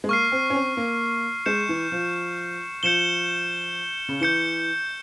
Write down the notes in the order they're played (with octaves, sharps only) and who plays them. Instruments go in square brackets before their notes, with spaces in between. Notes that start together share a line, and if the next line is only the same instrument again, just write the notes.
[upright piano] G#3
[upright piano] A#3 [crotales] C#6 F6 C7
[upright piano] C4
C#4
C4
A#3
[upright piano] G#3 [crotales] G6 C#7 E7
[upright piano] E3
F3
[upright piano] F3 [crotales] G6 C#7 E7 G7
[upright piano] C#3
[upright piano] E3 [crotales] G6 C#7 G7